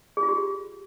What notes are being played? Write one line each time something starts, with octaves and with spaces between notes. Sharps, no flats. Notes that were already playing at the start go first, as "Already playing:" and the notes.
G#4
F4
G4